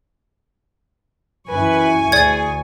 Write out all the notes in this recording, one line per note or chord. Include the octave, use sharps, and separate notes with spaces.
F#2 E3 B4 G#5 C#6
D2 G#4 D5 G#6